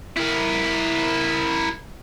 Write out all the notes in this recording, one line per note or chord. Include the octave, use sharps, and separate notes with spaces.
E4 A#4